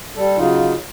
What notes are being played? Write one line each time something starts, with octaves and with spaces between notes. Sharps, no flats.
G3 A4
C#3 F#3 D#4 F4